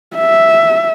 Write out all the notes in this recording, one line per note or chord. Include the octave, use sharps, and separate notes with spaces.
E5